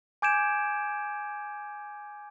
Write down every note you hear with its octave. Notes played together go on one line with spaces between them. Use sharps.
G#5 D6 G6 G#6 D7 E7